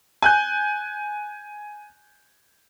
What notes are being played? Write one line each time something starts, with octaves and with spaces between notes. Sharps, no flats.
G#5 F#6 G6